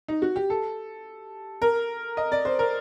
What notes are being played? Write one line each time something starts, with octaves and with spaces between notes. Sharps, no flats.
D#4
F#4
G4
A4
A#4
D#5
D5
C5
A#4